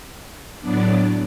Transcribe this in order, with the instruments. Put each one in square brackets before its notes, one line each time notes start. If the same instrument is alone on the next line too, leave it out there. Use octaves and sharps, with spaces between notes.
[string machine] A2 F#3 B3 D4 D5